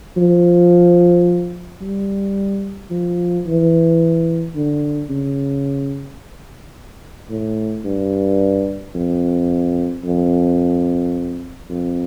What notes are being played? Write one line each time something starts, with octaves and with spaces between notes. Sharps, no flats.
F3
G3
F3
E3
D3
C#3
A2
G2
F2
F2
F2